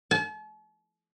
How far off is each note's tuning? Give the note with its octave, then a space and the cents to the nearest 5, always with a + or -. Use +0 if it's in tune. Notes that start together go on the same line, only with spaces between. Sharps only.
A5 -45